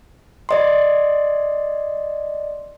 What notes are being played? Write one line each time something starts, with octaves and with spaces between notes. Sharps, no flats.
D5 D#5 C6